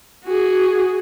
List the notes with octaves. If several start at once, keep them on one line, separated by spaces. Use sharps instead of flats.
F#4 G#4